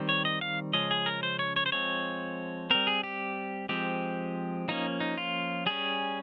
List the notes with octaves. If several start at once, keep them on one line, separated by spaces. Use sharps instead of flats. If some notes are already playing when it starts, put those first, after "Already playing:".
Already playing: D#3 G3 C4
C#5
D#5
F5
C#3 F3 G#3 C#4 D#5
G#4
A#4
C5
C#5
C#5
C5
F3 G#3 C4 C#5
G3 C4 A#4
G#4
G4
F3 G#3 C4 G4
F3 A#3 C#4 D#4
D#4
F4
G3 C#4 G#4